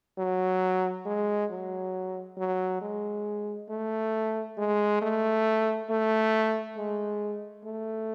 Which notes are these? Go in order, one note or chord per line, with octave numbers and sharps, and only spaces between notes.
F#3
G#3
F#3
F#3
G#3
A3
G#3
A3
A3
G#3
A3